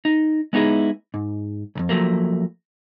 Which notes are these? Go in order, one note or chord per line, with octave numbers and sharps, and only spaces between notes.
D#4
G#3 B3 D#4 E4 G#4
G#2
B1 F2
F3 F#3 A3 A#3